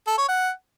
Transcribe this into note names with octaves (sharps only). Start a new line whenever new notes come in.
A4
C#5
F#5